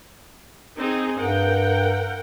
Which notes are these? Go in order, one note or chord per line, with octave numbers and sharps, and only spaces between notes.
C4 D#4 G#4
G2 A#4 F#5 G5